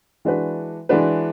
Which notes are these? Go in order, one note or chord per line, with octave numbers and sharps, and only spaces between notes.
E3 G#3 D4 F#4 B4
E3 G#3 D4 F#4 B4